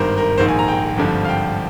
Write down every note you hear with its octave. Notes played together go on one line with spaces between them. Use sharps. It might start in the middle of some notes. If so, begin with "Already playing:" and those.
Already playing: G#1 G2 D#3 A#4 C5
A#4
A#1 G#2 D#3 C5
G#5
A#5
G5
G#1 G2 D3 F3
F5
G5